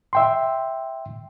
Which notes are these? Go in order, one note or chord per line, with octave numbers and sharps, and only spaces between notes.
E5 G5 C6